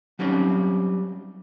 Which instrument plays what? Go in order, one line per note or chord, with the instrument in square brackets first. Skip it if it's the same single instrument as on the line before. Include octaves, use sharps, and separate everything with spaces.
[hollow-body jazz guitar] F#3 G3 C4 C#4 D#4